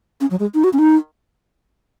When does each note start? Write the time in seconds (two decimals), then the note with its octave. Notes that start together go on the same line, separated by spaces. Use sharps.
0.21 C#4
0.31 F#3
0.40 G#3
0.55 D#4
0.64 F#4
0.73 C#4
0.79 D#4